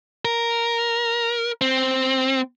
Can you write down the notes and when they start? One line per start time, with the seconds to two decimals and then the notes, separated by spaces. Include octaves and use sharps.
0.25 A#4
1.61 C4